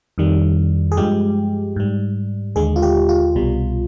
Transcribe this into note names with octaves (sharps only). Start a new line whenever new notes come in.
F2 D#3 G3
G#4
G2 F3 G#3 G4
G#2 G3
D#2 D3 G#3 G#4
F4
G4
F4
C2 B2 G3